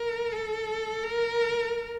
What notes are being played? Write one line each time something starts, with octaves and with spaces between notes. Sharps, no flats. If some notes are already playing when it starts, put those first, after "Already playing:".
Already playing: A#4
A4
A#4